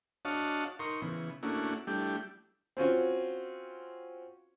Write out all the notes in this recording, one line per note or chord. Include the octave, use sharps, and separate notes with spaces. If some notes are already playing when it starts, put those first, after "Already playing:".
D4 F#4 C#5 D#5 F5 A5
D#4 A#4 C6 C#6
C#3 E3 B3
A3 A#3 C#4 D4 E4 F#4
G3 A3 D4 E4 G4
C4 C#4 F4 F#4